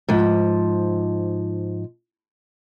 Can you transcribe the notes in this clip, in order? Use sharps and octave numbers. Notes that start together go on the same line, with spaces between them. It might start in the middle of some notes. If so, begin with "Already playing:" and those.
G#2 F3